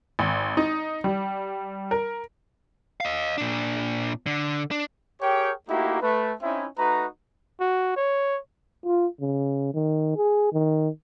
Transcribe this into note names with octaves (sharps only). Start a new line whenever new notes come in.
G#1
D#4
G3
A#4
D#5 F5
A#2 D4
D3
D4
G4 G#4 A#4 C#5 G5
A3 A#3 D#4 E4 F#4 G4
A3 B4
C4 C#4 D#4 E4
A3 D#4 F#4 B4 A#5
F#4
C#5
F4
C#3
D#3
G#4
D#3